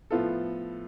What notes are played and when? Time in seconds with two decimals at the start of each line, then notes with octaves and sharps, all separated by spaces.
0.11 A2 F3 B3 F4 A4